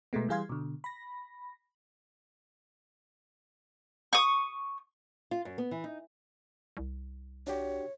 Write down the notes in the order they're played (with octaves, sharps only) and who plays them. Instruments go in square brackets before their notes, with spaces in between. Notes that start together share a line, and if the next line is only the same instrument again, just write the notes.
[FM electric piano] B2 G#3 A3 B3
E3 G3 G#4 F5 C6 G#6
B2 D3
B5 A#6
[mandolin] C#6 D#6
[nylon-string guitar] F4
F#2
B3
E3
D#4
[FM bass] C2
[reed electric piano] D4 F#4 G4 [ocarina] C#5